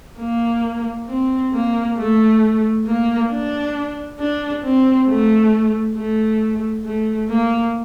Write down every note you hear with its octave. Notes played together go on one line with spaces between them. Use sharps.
A#3
C4
A#3
A3
A#3
D4
D4
C4
A3
A3
A3
A#3